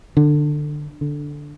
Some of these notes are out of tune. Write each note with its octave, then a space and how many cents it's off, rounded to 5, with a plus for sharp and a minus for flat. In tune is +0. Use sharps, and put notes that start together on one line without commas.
D3 +20
D3 -5